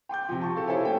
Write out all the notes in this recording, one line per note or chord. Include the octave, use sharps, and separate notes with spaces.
G5 C6 D6 G6
C3 F3
A5 C#6
F#4 G4 A4 F5
E4 A4 C5 C#5 E5 G#5
A3 A#3 C#4 G5